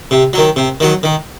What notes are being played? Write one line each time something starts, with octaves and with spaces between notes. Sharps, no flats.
C3
D#3 F#3
C3
D#3 F#3
D#3